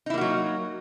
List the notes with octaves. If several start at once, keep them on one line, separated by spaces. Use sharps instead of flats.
F#3 A#3 D#4 E4 F#4